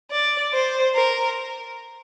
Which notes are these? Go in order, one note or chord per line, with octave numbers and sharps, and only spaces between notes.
D5
C5
A#4